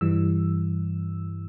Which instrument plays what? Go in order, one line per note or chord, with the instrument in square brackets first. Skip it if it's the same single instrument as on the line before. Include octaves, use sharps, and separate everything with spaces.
[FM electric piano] G2 E3 G3 E6